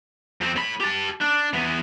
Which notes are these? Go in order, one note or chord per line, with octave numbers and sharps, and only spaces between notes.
F2 C4
A2 B5
G4 A5
D4
E3 B3